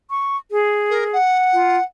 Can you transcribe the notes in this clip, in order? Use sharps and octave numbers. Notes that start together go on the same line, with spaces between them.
C#6
G#4
A#4
F#5
F4